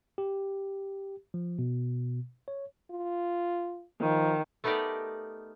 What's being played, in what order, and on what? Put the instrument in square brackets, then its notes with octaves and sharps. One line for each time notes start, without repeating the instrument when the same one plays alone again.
[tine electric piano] G4
F3
B2
C#5
[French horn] F4
[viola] D#3 [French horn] F3
[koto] A3 B3 D#4 G4 A#4 D5